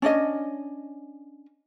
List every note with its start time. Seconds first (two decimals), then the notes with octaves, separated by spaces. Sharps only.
0.02 C#4 D4 C#5 D#5